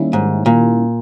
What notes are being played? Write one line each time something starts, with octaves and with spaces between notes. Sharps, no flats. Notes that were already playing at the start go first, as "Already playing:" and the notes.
Already playing: D#3 G3 A#3 C#4 E4
G#2
A#2